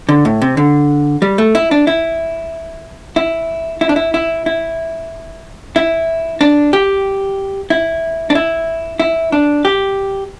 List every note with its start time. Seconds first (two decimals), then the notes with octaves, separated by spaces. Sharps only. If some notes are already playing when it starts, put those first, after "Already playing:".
0.09 D3
0.25 A2
0.42 C3
0.57 D3
1.22 G3
1.38 A3
1.55 E4
1.71 D4
1.87 E4
3.16 E4
3.81 E4
3.89 D4
3.96 E4
4.14 E4
4.46 E4
5.76 E4
6.41 D4
6.73 G4
7.70 E4
8.30 D4
8.35 E4
9.00 E4
9.32 D4
9.65 G4